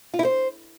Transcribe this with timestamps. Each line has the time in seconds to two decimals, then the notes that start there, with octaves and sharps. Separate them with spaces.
0.14 F4
0.19 E4
0.25 C5